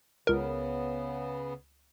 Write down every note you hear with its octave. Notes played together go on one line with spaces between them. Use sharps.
C#2 C#3 B3 A#4